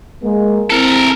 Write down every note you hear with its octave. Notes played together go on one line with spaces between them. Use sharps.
G#3 A#3
C4 E4 A4 A#4